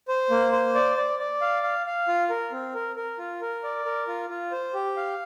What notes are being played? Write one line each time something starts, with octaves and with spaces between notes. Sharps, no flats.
C5
A#3
C5
D5
D5
D5
F5
F5
F5
F4
A#4
C4
A#4
A#4
F4
A#4
D5
A#4
F4
F4
C5
G4
F5